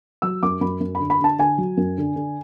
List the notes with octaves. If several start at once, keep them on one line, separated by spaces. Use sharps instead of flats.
F#3 E6
F#2 D6
F#2 B5
F#2
B5
D3
B5
D3 A5
D3 G#5
F#3
F#2
D3
D3